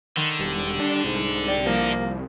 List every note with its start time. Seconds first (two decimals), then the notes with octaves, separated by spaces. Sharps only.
0.17 D3 D#3
0.39 E1 G3
0.80 D4
1.04 C2 G#2
1.48 G4 D5
1.66 F3 A#3